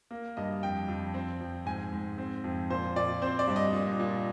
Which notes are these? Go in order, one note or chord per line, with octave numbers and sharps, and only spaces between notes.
A#3
G2 D#5
F2 G5
F2
C4
F2
G#2 G#5
G#2
C4
F2
A#2 C5
A#2 D5
C4 C5
D5
G2
D#5
A#2
A#2